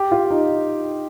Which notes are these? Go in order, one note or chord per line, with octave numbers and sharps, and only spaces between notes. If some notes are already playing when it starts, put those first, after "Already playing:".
Already playing: G4
F4
D#4